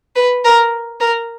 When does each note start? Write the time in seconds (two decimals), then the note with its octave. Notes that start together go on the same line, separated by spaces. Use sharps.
0.16 B4
0.44 A#4
1.00 A#4